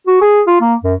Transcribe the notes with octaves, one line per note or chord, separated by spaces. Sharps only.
F#4
G#4
F4
A#3
F#2